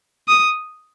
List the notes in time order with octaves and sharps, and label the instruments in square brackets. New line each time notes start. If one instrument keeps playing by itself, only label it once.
[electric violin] D#6